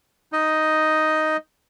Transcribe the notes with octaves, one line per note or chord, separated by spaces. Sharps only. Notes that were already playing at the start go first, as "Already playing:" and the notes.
D#4 D#5